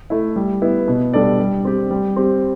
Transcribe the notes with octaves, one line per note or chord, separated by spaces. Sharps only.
A3 E4
G3
B3 E4
B2
G3 D4 A4 D5
G3
C4 G4
G3
C4 G4